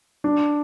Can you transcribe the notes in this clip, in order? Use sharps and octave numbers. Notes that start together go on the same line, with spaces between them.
D4